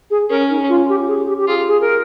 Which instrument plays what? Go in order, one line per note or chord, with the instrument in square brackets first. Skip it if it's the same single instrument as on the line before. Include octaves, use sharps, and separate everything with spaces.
[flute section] G#4
[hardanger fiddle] C#4 [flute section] A#4
[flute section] D#4
F4
G4
G#4
G4
G4
[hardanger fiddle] F4 [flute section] G#4
[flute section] G#4
A#4